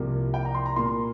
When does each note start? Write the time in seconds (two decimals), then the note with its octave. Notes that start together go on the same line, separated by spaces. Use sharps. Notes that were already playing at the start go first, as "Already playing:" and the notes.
Already playing: C2 C3 F3 A#3
0.34 G5
0.45 A#5
0.55 C6
0.66 A#5
0.76 A#2 A#3 C6